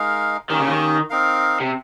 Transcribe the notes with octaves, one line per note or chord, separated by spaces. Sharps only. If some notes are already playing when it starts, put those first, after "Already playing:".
Already playing: G#3 D#4 A#4 F5
D#3 A#3 C#4 G4
C#3
D#3
C4 D#4 A#4 F5
C3